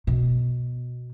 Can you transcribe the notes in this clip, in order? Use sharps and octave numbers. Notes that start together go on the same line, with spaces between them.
B2